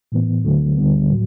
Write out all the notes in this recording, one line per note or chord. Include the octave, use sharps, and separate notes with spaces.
A2 E3 B3
D2 D3 F#3 A3
D2 D3 G3 B3
A2 F#3